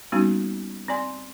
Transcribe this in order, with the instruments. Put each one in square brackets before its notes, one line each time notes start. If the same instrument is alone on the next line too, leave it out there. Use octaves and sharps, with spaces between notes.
[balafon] G3 A#3 B3 C#4 D#4 F#4
C4 D5 G#5 C6